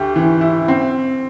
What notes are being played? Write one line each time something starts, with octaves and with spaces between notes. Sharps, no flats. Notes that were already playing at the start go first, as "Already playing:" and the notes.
Already playing: D2 G4
E3
E4
C4